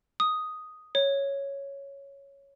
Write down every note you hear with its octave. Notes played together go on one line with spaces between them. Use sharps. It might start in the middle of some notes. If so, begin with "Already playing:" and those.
D#6
C#5